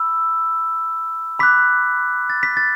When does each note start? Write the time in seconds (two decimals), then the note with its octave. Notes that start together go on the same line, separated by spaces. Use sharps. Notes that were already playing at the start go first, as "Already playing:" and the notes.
Already playing: B5 E6
1.39 B5 D6 F#6 B6
2.30 A6
2.43 B6
2.57 A6